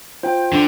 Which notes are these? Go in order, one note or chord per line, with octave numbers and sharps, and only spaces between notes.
F4 C5 G5
D3